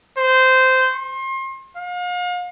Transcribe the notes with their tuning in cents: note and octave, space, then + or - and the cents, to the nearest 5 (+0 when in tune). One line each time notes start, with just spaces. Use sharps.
C5 -15
C6 +35
F5 +40